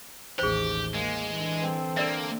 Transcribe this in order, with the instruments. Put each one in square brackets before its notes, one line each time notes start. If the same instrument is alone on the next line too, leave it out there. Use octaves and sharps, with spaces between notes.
[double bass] A1 D#2 [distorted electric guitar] G4 [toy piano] G#4 C5
[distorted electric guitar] G#3 [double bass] A#3
[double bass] D3 E3
[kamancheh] C4 A4
[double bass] D3 [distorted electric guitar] A#3 [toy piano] A#4 D5 E5